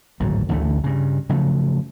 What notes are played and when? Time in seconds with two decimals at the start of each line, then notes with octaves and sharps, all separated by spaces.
0.20 D1 G#1 G#2 F#3
0.49 A1 D2 D3 A3
0.84 G2 C#3
1.29 C#3 F3 F#3 A3